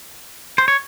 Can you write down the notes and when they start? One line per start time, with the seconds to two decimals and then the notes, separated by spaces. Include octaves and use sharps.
0.58 C5
0.68 C#5